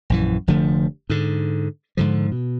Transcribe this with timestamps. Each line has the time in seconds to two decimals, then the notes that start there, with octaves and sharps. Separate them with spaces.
0.10 A#1 F#2 E3
0.47 F1 D3 F3 A3
1.10 G#2 D3
1.97 G#2 D3 F3
2.32 B2